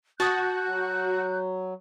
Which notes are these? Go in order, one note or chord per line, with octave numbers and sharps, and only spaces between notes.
F#4 A5 D#6 F#6 G6
F#3